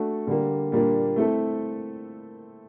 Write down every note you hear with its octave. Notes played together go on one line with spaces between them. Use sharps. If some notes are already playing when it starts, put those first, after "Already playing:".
Already playing: A3 D4 F#4 A4
D3 G3 A#3
A#2 G3 A#3 D4
A3 C4 E4 A4